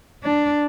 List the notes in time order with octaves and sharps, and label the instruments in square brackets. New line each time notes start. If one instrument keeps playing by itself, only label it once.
[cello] D4